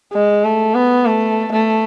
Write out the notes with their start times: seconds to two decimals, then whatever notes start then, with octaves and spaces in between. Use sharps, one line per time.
0.13 G#3
0.45 A3
0.75 B3
1.06 A3
1.52 A3